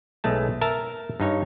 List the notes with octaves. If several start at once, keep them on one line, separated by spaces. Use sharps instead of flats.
B1 G#3 A3 A5
A#4 E5 A5
G2 D#4 C#5